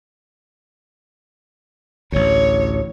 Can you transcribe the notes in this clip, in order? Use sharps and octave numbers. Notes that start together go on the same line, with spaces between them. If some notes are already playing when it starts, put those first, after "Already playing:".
A1 D2 C#5